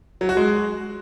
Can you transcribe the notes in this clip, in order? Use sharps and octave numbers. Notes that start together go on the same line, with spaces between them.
F#3
F#4
G#3